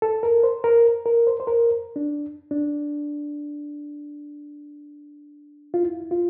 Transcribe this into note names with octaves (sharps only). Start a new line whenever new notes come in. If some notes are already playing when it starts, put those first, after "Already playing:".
A4
A#4
C5
A#4
A#4
C5
C5
A#4
D4
D4
F4
E4
F4